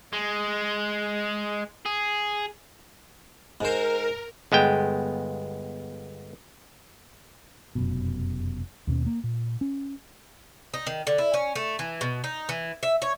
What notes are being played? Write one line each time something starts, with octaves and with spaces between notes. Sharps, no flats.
G#3
G#4
G#2 A#4 C5
G1 G#3 B3 G5
F1 F#2 B2
D#2 B2 C#4
A#3
A#2
C#4
D#4
D#3
D3
E4
C#4
A3
E3
B2
D#4
E3
E5
C#5